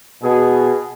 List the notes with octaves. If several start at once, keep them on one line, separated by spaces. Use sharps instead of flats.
B2 G#4